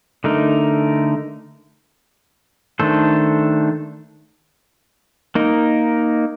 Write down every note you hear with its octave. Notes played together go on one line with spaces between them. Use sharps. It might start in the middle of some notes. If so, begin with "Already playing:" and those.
D3 A3 D#4 A#4
D#3 A3 D4 A4 C5
A#3 D#4 A#4